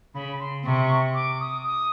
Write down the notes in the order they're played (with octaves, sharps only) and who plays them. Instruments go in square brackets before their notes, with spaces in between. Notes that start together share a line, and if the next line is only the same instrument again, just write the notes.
[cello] C#3 [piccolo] B5
[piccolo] C6
[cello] C3 [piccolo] C#6
[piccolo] D6
D#6
D#6